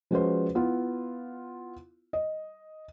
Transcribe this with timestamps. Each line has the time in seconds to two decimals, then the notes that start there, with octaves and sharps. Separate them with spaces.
0.11 F3 G#3 C#4 F#4 B4 C5
0.55 B3 E4 F4
2.13 D#5